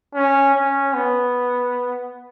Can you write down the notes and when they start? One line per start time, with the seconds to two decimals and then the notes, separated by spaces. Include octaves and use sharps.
0.15 C#4
0.55 C#4
0.94 B3